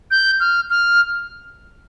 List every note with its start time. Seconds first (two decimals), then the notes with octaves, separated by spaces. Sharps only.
0.11 G6
0.40 F6
0.70 F6